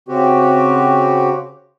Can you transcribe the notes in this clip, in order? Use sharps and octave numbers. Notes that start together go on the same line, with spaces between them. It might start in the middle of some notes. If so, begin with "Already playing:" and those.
C#3 C4 F#4 G4